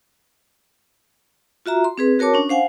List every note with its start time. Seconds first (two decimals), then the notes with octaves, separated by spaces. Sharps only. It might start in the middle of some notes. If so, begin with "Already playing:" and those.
1.66 F4 F#4 E5 A#5
1.84 C6
1.98 C4 G#4 B4
2.19 F#4 A#4 C#5 A5 D6
2.34 C#4 D4
2.49 C5 F5 F#5 G#5